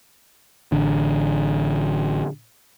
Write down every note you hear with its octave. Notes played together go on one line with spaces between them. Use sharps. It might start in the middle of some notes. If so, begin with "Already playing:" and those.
A1 D3